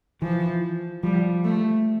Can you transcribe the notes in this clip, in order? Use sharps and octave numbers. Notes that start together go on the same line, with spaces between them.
E3 F3
F3 G3
A3